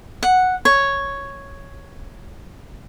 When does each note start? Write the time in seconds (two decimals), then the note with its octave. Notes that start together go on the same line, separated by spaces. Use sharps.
0.23 F#5
0.65 C#5